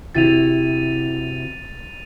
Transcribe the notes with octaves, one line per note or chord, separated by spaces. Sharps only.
C3 E4 F#4 A6 D#7 F7